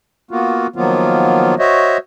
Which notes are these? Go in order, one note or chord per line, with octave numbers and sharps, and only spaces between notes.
A#3 B3 F4 F#4
D#3 F3 F#3 A#3 B3 F4
F#4 C5 C#5 D#5 E5